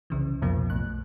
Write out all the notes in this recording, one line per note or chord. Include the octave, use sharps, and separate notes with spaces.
C2 C#3 E3
C2 F2 B2 F3 A#3
B1 A2 F#6